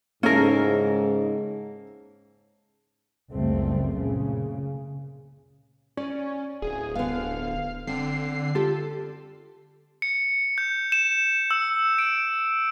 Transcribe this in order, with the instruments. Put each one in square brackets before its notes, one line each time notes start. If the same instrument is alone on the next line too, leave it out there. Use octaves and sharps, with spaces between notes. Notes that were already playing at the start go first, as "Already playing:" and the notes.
[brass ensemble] G#2 C#3 [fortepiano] A#3 E4 A4 [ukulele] C#4 A#4
[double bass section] F#1 C#2 F#2 G3 A3 C4
A#2 C#3
[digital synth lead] C#4 [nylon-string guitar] D5
[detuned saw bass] D1 [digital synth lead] G#4
[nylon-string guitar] D3 B3 [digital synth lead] F5
[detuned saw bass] D3 [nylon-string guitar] C4 [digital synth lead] C7
[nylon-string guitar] F4 G4 [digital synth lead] A4
[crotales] C#7
G6
E7
E6
D7